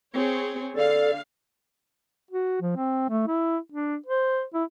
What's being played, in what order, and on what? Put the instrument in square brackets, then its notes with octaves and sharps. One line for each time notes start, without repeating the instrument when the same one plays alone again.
[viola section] C4 G#4 C#5
[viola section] D3 F5 [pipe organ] A4 D5
[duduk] F#4
F3
C4
A3
E4
D4
C5
E4